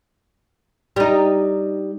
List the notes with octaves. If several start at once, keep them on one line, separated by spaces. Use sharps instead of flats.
G3 D#4